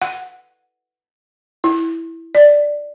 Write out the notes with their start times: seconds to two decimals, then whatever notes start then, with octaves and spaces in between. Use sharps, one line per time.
0.02 F#5
1.64 E4
2.35 D5